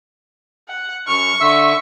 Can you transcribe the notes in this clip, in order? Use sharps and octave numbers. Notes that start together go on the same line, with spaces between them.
F#5
F#2 C#6 F6
D3 E5 E6